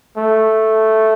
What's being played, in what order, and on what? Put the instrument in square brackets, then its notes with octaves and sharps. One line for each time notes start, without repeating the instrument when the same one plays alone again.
[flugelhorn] A3